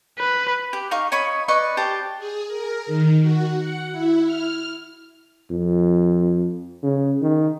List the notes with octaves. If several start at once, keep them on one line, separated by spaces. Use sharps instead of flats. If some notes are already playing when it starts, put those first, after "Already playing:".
B4
G4
D#4 F5 C#6
C#5 D#5 B5 C#6
B4 D5 D#5 C#6
G4 C5 A5
G#4
A#4
D#3
F#4
F#5
E4
F6
F2
C#3
D#3